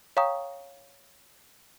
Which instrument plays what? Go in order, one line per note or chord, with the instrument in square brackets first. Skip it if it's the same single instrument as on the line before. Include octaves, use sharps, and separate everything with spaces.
[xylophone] C#5 F5 G5 A#5 C#6 D#6